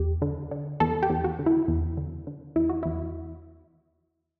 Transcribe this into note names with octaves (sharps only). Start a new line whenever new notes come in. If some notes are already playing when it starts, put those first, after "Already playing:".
Already playing: E2 G4
D3
D3
E2 A4
G4
E2
F#4
D3
E4
E2
D3
D3
E2 E4
F#4
E2 E4